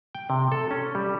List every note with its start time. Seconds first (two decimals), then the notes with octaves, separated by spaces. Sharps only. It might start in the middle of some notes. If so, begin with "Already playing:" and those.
0.15 G5
0.30 C3
0.52 A4
0.71 C#4
0.95 G3